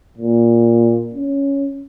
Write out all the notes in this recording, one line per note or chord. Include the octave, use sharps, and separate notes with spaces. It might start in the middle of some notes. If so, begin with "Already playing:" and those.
A#2
C#4